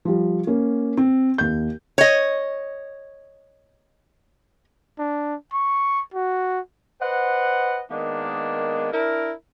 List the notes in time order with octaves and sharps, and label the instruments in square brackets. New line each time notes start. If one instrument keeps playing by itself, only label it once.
[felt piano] F3 G3
A#3 C#4
C4
D#2 G6
[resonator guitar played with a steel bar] C#5 D#5
[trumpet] D4
C#6
F#4
[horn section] B4 C5 D#5 F#5
D#3 G#3 A#3 B3 D4
D4 E4 A#4